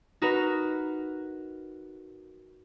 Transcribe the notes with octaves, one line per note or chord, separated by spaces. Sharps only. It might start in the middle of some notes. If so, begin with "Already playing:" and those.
D#4 F#4 A#4 B4